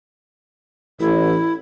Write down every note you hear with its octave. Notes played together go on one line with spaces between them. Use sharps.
A1 E4